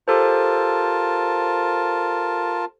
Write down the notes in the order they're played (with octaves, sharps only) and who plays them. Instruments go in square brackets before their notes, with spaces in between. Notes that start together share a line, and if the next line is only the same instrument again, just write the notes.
[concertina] F4 A#4 A5 [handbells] G4 A4 C5